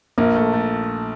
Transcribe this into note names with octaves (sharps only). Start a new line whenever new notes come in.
A#1 A#3
A3
A3